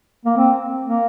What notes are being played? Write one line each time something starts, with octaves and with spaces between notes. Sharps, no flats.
A#3
C4
A#3